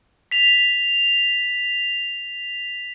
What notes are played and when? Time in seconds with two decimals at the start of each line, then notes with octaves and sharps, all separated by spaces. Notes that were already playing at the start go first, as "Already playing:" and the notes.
0.31 B6 F7